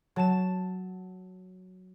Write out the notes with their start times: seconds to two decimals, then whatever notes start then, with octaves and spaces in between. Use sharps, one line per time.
0.16 F#3 A5 E7